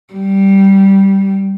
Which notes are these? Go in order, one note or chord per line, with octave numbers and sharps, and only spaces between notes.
G3